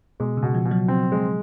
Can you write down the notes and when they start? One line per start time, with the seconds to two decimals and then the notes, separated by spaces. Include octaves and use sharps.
0.20 B2 G#3
0.37 C#3
0.43 B2
0.54 F3
0.65 B2
0.71 F#3
0.88 C4
1.12 G#3